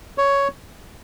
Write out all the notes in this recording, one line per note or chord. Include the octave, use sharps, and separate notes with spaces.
C#5